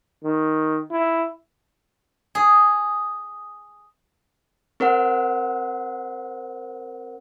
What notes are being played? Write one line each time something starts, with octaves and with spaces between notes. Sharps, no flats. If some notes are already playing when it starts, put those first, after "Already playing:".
D#3
E4
G#4
C4 A#4 C5 F#5